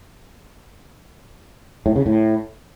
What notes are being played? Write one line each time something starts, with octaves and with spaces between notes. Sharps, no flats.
A2
C#3
A2